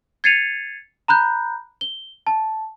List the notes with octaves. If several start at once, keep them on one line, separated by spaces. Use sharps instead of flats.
G#6 A6 C7 C#7 D#7 F7
A#5 B5 F#6 G6
G7
A5